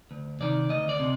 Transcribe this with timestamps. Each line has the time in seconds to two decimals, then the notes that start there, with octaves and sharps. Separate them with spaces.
0.11 D2
0.40 C3 D#3 D5
0.70 D2 D#5
0.89 D5
0.99 C3